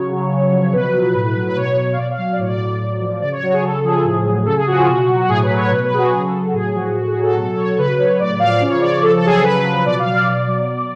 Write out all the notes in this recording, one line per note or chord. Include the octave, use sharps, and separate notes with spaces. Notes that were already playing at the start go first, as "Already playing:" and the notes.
Already playing: C#3 F#3 C#5
F#3
C#3
F3
B2 B4
F#3
A2
F#3
B4
B2 C#5
F#3
F5
B2 D5
F5
F#3
F5
D5
A2 C#5
D5
F#3
A2
F3
C#3 D5
C#5
F#3 F#4
G#4
C#3 A4
F3 G#4
A2
F#3
C#3 A4
G#4
F3 F#4
F4
B2 F#4
F#3
F#4
A2 G#4
B4
F#3
C#5
B2 B4
B4
F#3 G#4
F#4
C#3 G#4
A4
F#3
A4
F#4
A2 G#4
F3 F#4
A2 F#4
G#4
F#3
A4
B2 A4
F#3 C#5
C#3 B4
F#3 C#5
A2 D5
F3 F5
D5
C#3
C#5
F3 D5
C#3 A4
A4
F#3 G#4
A4
C#3 B4
F3
B2 D5
F5
F#3
D5
B2
F#3
B2